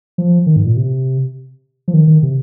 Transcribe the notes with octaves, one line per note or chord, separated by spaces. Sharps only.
F3
D#3
G#2
A#2
C3
F3
D#3
D#3
C3